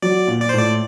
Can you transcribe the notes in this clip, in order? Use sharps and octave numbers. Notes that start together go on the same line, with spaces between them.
F#3 D5
A#2
D5
C5
A2 D5